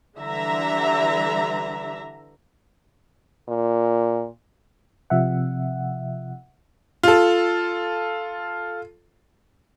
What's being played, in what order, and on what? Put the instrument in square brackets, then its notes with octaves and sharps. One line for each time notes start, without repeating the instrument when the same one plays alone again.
[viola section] D3 E3 G3 E5 A#5
[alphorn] A#2
[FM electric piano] C3 F3 E5 F#5
[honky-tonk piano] F4 A4